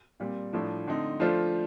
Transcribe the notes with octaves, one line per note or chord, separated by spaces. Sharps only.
A#2 G3 C4
A2 F3 A3 D4
D3 A3 C4 D#4
F3 A3 D4 F4 C5